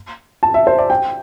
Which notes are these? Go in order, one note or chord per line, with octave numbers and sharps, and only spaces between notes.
A5
E5
C5
D5
G5